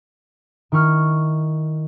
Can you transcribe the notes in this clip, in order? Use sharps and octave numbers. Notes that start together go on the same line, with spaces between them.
D#3 E4 C#6 F6